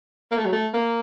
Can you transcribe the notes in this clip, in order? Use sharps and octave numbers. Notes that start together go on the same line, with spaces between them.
A#3
A3
F#3
A3
A#3